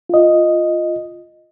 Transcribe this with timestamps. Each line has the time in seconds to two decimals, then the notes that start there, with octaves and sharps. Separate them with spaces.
0.09 F4 D#5